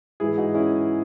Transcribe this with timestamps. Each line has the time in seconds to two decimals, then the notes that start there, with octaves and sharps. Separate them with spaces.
0.20 G#2 E3 E4 G#4
0.37 D#4 F#4
0.55 C#4 E4